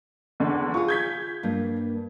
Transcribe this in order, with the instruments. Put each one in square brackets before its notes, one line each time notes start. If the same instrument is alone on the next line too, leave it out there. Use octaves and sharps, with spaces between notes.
[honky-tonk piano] E2 D3
[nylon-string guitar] F4 G#4 [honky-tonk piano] C#6
[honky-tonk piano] G6 G#6 B6
[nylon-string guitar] G2 A#3